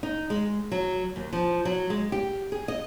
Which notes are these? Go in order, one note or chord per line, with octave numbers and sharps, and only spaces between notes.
D#4
G#3
F#3
D#2
F3
F#3
G#3
G4
G#4
D#5